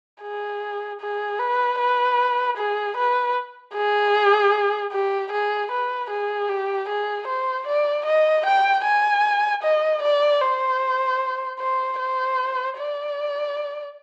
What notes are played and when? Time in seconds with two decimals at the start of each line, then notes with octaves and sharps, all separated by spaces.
0.22 G#4
1.01 G#4
1.39 B4
1.79 B4
2.57 G#4
2.97 B4
3.74 G#4
4.92 G4
5.32 G#4
5.71 B4
6.10 G#4
6.49 G4
6.89 G#4
7.27 C5
7.67 D5
8.06 D#5
8.46 G5
8.84 G#5
9.63 D#5
10.03 D5
10.41 C5
11.59 C5
11.99 C5
12.77 D5